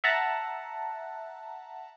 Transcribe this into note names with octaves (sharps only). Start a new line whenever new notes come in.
E5 F#5 A5 A#5